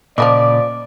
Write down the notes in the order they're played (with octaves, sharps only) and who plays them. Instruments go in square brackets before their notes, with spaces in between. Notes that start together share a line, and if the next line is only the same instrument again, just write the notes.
[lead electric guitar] A#2 C#3 [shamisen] F3 B4 D#5 [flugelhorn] D5 [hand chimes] D6